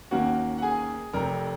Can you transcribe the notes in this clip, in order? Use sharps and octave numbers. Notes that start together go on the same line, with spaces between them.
D#2 D#3 A#3 C#4 F#4 F#5
F#5
G#4 G#5
F1 F2 C3 A#4 A#5